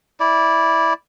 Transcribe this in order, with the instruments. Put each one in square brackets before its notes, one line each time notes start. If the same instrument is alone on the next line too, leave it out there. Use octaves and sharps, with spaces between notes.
[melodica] E4 D5